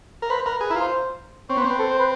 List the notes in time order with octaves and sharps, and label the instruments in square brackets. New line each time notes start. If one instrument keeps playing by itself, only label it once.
[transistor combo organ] A#4
[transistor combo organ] B4 [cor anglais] C5
[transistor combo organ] A#4 [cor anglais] B4
[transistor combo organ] G#4 [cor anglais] B4
[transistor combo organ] E4 [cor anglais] A#4
[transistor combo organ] F4 [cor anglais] C5
[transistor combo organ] C4 [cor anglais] C#5
[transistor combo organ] B3 [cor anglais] C5
[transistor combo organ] C4
[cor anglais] B4
A4
C5
B4